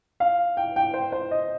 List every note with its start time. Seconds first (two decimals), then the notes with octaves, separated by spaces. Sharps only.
0.20 F5
0.57 G5
0.76 G5
0.94 C5
1.12 C5
1.31 D#5